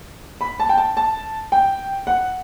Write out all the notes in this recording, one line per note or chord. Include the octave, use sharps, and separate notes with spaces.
B5
A5
G5
A5
A5
G5
F#5